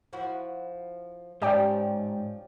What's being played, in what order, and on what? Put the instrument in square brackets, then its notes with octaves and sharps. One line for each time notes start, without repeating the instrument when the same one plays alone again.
[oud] F3 E4 F#4
[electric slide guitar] G#2 [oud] F3 C#4 D#4 [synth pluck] G4 D5 G5